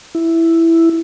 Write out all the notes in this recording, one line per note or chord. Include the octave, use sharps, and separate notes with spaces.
E4